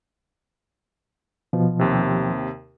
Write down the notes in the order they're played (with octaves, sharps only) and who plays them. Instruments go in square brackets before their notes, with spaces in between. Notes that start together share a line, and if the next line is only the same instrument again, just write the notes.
[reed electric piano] B2 F3
[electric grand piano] D#2 C3